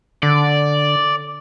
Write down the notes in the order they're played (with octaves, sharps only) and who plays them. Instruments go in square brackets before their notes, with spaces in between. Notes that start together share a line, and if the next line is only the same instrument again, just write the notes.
[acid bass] D3 [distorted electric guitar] D5